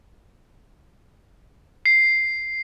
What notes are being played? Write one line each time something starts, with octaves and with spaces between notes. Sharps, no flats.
C7